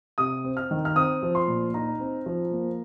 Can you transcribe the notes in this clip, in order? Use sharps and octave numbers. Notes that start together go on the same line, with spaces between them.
C3 D#6
C4
F6
D#3
F6
C4 D#6
F3
C6
A#2
D#4 A#5
C4
F3
A#3